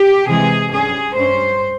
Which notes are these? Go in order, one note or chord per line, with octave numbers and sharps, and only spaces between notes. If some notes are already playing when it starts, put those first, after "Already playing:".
Already playing: G4
C3 E3 G#3 G#4
G2 G3 C#4 G#4
G2 G3 C#4 C5